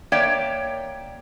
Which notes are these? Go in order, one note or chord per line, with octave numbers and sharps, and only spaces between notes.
A#3 C#5 D5 E5 G5